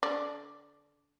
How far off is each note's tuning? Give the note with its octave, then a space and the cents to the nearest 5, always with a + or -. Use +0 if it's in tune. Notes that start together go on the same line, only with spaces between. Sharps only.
D3 -25 D5 +0